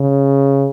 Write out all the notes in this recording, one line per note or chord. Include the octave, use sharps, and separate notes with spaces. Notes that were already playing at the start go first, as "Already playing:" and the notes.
Already playing: C#3